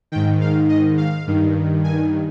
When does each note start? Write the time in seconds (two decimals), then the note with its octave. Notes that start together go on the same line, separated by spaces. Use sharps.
0.12 D#3 G5
0.15 G#2
0.41 F5
0.69 D#5
0.97 F5
1.27 G2 D#3
1.84 G#5